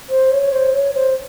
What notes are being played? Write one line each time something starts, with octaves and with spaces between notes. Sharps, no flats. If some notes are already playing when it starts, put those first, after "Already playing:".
C5
C#5
C5
C#5
C5